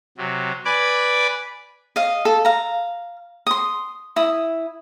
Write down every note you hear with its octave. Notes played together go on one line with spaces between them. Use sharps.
C3 F#3
B4 D5 G#5 B5 D6 G#6
D#5 F5
A4
F5 A#5
C6 D#6
E4 D#6